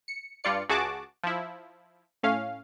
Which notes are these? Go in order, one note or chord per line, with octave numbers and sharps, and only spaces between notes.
C#7
G2 F4 D5 C#7
C#2 F#4 G#4 A5 D6
F3 E4
A2 C#4 F5